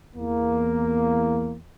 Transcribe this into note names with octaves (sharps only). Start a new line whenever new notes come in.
E2 A#3